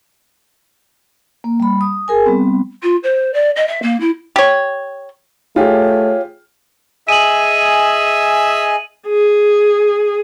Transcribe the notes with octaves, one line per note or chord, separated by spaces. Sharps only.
A#3
G3 B5
D#6
G#4 A#4 G#5
G3 B3 C4
F4
C5
D5
D#5
E5
A#3
E4
G4 C#5
A3 F4 G4 G#4 C#5
G#4 D#5 E5 G#5 D#7 F#7
G#4